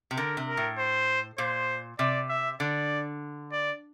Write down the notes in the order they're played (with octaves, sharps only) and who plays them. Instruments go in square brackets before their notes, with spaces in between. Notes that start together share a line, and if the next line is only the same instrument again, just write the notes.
[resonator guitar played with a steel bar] C3
[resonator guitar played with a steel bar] D3 [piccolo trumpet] A#4
[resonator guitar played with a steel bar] C3
[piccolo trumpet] A#4
[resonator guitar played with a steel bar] A2
[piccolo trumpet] C5
[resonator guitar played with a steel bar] A#2 [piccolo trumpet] C5
[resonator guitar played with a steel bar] C3 [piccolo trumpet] D5
[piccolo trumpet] E5
[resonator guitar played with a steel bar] D3 [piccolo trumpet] D5
[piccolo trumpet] D5